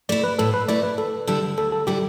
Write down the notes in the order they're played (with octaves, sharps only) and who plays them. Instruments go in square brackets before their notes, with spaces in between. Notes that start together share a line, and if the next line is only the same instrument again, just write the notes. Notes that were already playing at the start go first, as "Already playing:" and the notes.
[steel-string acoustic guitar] A3 E4 [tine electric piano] D5
[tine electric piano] B4
[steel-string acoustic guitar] A2 [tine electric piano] A4
[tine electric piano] B4
[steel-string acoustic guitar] A3 E4 [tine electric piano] D5
[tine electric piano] B4
[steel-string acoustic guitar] D2 [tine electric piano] A4
[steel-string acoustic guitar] D3 G3 E4 [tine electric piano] A4
[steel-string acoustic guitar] D2 [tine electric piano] A4
[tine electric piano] A4
[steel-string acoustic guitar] D3 G3 E4 [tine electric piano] G4